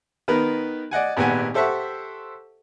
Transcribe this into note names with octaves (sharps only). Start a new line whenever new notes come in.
D#3 B3 A#4 B4
D5 D#5 F#5 G#5
G#1 A#2 B3 G4 F#5 G#5
G4 A4 C5 E5 F#5 C#6